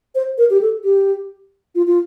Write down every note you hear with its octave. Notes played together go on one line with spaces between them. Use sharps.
C5
A#4
G4
A4
G4
F4
F4